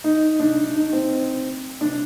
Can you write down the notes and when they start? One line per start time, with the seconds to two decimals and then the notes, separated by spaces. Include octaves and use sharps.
0.04 D#4
0.40 D4
0.75 D#4
0.92 C4
1.81 D4